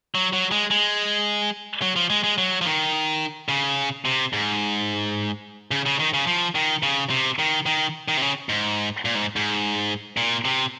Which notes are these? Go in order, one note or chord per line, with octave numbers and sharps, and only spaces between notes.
F#3
F#3
G#3
G#3
F#3
F3
G#3
G#3
F#3
F3
D#3
C#3
C3
G#2
C#3
C#3
D#3
C#3
F3
D#3
C#3
C3
D#3
D#3
D#3
C3
C#3
G#2
A#2
G#2
G#2
A#2
C3